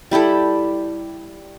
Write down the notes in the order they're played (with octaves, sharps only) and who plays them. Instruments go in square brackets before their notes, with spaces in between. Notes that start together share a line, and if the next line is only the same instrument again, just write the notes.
[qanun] G3 E4 G4 A4